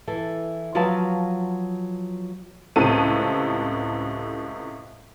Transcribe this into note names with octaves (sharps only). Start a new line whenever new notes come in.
E3 A4
F3 F#3 F#4 B4 F5 A5
C#2 A2 C3 A4 A5 D#7